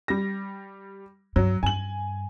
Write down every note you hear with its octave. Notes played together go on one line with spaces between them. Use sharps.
G3 A#6
G2 F#3
G2 G#5 F#7